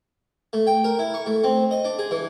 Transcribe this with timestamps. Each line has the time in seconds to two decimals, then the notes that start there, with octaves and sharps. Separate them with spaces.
0.53 A3
0.67 G5
0.84 A#4
0.99 E4
1.14 C#6
1.26 A3
1.44 C4
1.71 D#5
1.85 D4
1.99 G#4
2.11 E3